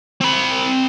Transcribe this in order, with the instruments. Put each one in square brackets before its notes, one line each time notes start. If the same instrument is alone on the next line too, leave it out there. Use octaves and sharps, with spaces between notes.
[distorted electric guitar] C4 B5